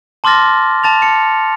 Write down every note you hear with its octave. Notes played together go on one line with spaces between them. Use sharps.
A5 C6 D6 F6 A6 A#6
A5 A6 F7
A5 C#7